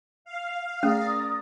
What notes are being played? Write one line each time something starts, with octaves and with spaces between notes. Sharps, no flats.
F5
A3 C#4 G#4 A#4 D5 D#6